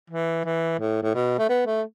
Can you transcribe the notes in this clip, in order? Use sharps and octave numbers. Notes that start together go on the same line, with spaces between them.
E3
E3
A2
A2
B2
A3
B3
A3